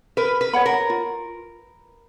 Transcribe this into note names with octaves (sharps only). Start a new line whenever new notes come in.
A#4 B4
B4
C#5 F#5 B5
A#4
F4